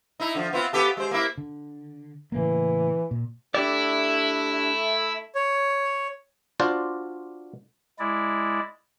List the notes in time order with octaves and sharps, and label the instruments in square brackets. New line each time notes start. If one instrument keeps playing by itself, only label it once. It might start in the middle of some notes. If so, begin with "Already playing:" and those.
[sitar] D#4 E4
D3 F3
B3 C4 F4
B3 G4 A4
G#3 C5
A#3 E4
[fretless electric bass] D3
[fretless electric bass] A2 C#3 A#3 [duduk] E3
[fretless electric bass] A#2
[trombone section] A3 [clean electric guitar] D4 G4 D5 [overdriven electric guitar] E4
[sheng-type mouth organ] C#5
[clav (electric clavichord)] D4 F4 F#4 C5 D5
[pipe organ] G#3 E4 D5